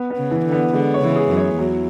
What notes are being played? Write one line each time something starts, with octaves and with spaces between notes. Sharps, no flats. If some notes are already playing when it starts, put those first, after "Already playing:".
Already playing: B3
B3
C#3
E3
D3
B3
D3 G#3
C#5
C#3 E3
G#4
F#2
C#5
E2 F#3